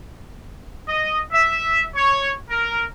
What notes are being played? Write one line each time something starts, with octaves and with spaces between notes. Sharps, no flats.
D#5
E5
C#5
A#4